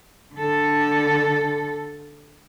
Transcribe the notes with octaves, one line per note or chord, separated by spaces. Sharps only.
D3 A4